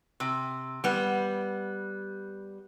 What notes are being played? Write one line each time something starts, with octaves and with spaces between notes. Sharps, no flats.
C3
G3 B3